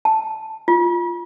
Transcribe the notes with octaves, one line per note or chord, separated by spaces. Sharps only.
A5
F4